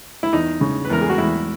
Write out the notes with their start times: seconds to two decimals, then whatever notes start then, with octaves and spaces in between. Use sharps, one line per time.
0.23 E4
0.32 E2 D#4
0.61 C#3
0.85 B4
0.90 E2 A#4
1.01 G#4
1.09 F#4
1.18 E2 E4